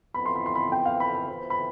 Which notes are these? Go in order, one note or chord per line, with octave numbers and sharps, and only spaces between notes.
F2 E3 B3 B5
C6
B5
C6
B5
G5
F5
B5
B5
E3 B3 F4 C5
B5